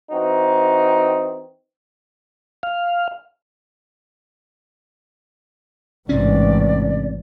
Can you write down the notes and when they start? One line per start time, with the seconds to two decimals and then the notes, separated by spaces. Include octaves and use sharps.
0.11 E3 C4 D#4 F#4
2.63 F5
6.09 A1 G#2 C3 C4 C#4 D5